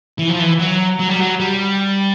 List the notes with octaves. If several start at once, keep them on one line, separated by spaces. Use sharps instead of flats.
E3
F3
E3
F#3
F#3
G3
F#3
G3